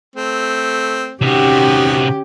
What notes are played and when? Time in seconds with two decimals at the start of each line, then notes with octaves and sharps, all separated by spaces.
0.16 A3 C4
1.21 C3 D#3 B3 C#4 F#4 G4